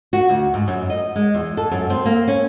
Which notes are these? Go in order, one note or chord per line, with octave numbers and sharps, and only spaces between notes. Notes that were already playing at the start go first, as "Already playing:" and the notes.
F#4
D2
G#2
F#2
D#5
G#3
E2
A4
F#2
C4
A#3
C#4